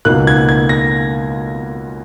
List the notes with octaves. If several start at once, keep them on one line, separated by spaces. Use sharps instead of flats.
C#2 B2 A#3 D#4 F#6
G#6
G#6
A#6